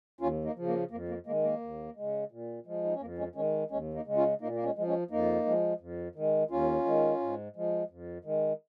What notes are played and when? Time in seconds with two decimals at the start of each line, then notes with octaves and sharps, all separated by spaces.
0.21 D#2 C#4 F4
0.44 A#3 D#4
0.56 C#3 F3
0.67 A#3
0.91 F2 A#3
1.09 A#3
1.26 D#3 G#3 A#3
1.43 A#3
1.61 D#2
1.96 C#3 G#3
2.31 A#2
2.66 F3 G#3
2.84 D#4
2.93 C#4
3.00 F2 A#3
3.18 G#3 C#4
3.35 D#3 G#3 C#4
3.70 D#2 G#3 C#4
3.94 A#3 D#4
4.06 C#3 G#3
4.17 C#4 F4
4.41 A#2 A#3 D#4
4.55 A#3
4.63 G#3 C#4
4.76 G#3
4.78 F3
4.87 G#3 C#4
5.11 F2 A#3 D#4
5.46 F3 G#3
5.80 F2
6.15 D#3 G#3
6.51 D#2 C#4 F4
6.85 D#3 G#3
7.20 G#2
7.56 F3 G#3
7.90 F2
8.25 D#3 G#3